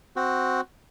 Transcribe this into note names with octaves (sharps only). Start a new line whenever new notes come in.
C4 F#4